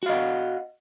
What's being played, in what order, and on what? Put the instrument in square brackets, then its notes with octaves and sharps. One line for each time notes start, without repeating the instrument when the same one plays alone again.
[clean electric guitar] F#4
F5
D#5
F#5